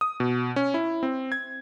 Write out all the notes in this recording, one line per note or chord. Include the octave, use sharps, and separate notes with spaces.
D#6
B2
C#4
E4
C4
G#6